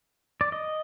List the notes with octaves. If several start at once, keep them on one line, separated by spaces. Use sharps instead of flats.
D5
D#5